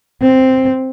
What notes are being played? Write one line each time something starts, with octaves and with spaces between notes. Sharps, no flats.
C4